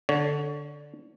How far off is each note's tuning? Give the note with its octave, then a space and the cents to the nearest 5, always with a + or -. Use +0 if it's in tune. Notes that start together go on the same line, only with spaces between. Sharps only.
D3 +0 C#5 +20